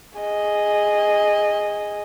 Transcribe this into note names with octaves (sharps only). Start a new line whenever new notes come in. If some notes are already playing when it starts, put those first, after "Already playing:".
G#4 D#5